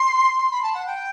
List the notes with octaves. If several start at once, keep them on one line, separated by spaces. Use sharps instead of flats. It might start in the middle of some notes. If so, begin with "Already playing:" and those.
Already playing: C6
C6
B5
A5
F#5
G5